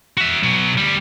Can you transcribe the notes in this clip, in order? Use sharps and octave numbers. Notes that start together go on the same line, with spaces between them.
F#4 E5
B2 F#3
D2 G3